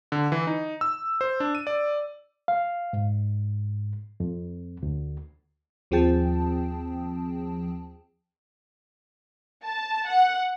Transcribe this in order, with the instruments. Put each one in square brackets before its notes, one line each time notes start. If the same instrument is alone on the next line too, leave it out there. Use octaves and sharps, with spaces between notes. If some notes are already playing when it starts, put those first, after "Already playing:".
[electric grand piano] D3
E3
D#4
E6
C5
D4
D#7
D5
[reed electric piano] F5
G#2
F2
D2
[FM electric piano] D#2 F3 C4 G#4 G5 A5
[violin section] A5
F#5